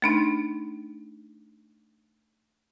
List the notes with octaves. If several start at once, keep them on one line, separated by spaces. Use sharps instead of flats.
A3 D4 D#4